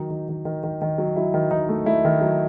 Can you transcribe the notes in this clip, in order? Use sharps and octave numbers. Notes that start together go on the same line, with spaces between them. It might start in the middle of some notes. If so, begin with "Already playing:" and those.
Already playing: D#3 F#3 D#4
D#3
D#3
D#3
D#3
D#3
F#3
F#3 E4
D#3
D#3 D#4
A3
A3 E4
D#3
F#3